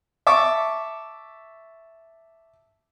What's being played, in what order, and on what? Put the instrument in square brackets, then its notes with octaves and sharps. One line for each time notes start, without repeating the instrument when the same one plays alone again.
[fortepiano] E5 A5 C#6 D6